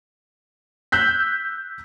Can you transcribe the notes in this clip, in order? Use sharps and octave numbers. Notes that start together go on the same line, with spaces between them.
E6 F#6 G6 B6